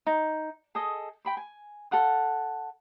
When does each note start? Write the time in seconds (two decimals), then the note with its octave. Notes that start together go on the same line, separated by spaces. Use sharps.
0.07 D#4
0.75 G#4 A4 D#5
1.25 G5 B5 C6
1.37 G#5
1.91 A4 F5 F#5 C6